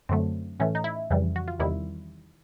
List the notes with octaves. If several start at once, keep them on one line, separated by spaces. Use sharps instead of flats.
F#2 D3 F#3 A3 C4
A2 E3 A3 C#4
D#4
E4
F2 C#3 E3 G3
F#4
F4
E2 C3 D#3 G3 E4